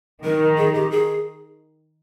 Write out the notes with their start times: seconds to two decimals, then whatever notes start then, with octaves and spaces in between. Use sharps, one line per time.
0.24 D#3 A#4
0.58 G#4
0.74 G4
0.91 G#4